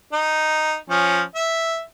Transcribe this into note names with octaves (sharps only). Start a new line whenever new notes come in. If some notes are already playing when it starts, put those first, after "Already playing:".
D#4
F3 C#4
E5